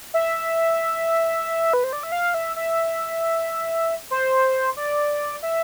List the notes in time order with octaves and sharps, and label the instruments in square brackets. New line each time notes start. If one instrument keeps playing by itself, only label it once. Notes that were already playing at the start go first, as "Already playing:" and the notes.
[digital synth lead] E5
B4
C5
D5
E5
F5
E5
E5
C5
D5
E5